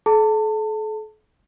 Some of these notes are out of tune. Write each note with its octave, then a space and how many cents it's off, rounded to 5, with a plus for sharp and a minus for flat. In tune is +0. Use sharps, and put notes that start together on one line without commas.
A4 -40 A5 +30